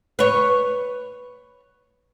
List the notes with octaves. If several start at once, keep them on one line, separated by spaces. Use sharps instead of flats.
B4 C#5